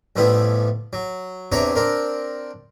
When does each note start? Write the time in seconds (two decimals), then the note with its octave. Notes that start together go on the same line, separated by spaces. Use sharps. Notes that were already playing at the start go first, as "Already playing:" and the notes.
0.16 A1 F3 G3 B3 E4
0.93 F#3
1.52 E2 C3 D4 C#5 F#5 A#5
1.76 C4 D4 A#4